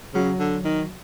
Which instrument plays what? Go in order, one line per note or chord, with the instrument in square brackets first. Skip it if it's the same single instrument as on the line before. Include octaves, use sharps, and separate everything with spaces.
[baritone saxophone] C#3 [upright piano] F#3 F#4
[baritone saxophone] D3
D#3